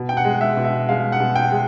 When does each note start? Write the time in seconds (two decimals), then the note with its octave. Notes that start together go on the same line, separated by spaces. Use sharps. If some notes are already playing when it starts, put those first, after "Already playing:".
Already playing: B2
0.09 G5
0.17 F#5
0.25 G#3
0.41 E5
0.57 B2
0.64 E5
0.89 G#3 F5
1.12 F#5
1.20 B2
1.35 G5
1.52 G#3